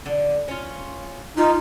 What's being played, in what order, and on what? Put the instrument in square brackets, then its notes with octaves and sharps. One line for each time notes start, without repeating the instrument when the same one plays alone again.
[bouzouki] D3
C#4 F4
[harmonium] D#4 [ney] F4